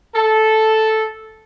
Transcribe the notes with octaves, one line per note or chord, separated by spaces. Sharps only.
A4